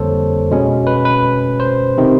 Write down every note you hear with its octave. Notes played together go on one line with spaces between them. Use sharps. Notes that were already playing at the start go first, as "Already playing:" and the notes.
Already playing: F2 D3 G3 A#3 A4 C5 C#5
B2 G#3 C#4
B4
B4
C5
C3 D#3